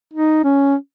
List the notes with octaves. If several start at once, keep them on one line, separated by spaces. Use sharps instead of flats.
D#4
C#4